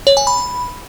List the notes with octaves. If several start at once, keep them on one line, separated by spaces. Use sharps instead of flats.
C#5
G#5
B5